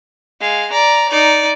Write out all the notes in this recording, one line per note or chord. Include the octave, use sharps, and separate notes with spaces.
G#3 F5
D5 A#5
D#4 D5